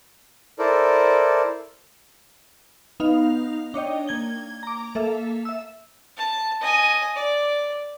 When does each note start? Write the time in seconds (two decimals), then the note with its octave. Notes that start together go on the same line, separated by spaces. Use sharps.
0.59 E4 A4 A#4 C5 D5
3.00 B3 D#4 F5 F7
3.74 D4 C#5 D#5 G5
4.08 A#3 G#6 G7
4.63 A#5 D6
4.95 A#3 A4 E5 F5
5.45 E5 E6
6.17 A5
6.61 D#5 G#5
7.16 D5